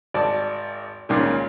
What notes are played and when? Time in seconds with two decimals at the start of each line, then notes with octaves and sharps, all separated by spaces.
0.14 G#1 D5 A5
1.09 C#2 A#2 D#3